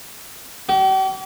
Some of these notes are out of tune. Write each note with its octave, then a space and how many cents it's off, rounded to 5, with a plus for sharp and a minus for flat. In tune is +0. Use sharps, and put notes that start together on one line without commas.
G4 -45